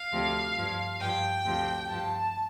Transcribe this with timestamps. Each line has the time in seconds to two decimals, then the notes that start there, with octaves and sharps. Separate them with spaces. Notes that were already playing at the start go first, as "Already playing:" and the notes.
Already playing: F5
0.12 D2 C3 F3
0.56 G2 F3
1.01 G2 F3 G5
1.45 D2 C3 F3
1.89 G2 F3 A5